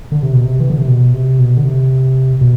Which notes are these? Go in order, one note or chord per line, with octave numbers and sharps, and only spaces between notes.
D3
C3
B2
C3
E3
D3
C3
B2
C3
B2
D3
C3
B2